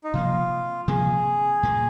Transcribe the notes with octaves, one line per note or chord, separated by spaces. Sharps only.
D#4
C3 F3 A#3 F4
C3 F3 A#3 G#4
A#2 A#3